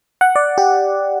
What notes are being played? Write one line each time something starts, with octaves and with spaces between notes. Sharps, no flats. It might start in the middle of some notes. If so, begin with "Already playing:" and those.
F#5
D5
G4